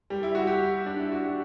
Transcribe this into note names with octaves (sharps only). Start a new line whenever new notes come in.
G3
E4
F#4
G4
D4
E4
F#4
G4